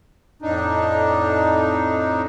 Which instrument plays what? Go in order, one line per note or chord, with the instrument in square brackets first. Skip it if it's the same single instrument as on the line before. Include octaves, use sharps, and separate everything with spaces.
[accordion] F2 A2 D4 D#4